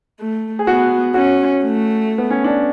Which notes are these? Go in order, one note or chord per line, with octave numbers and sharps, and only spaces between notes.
A3
G#4
B3 F#4
C#4 F#4
A3
B3
C#4
D4